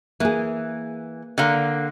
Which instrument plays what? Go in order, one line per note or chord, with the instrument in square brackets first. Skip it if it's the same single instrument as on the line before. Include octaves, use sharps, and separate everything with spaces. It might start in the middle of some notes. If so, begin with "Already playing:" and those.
[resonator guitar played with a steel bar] E3 [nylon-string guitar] A#3 G#4
[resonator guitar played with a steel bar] D3 A#3